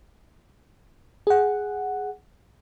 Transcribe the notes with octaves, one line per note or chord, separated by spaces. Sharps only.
G#4 F#5